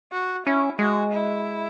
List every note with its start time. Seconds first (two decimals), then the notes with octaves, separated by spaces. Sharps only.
0.12 F#4
0.46 C#4 E4
0.79 G#3 F#4
1.12 E4